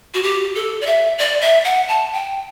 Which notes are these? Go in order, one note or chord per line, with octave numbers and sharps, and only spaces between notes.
F#4
G4
A4
D5
E5
D5
E5
F#5
A5
G5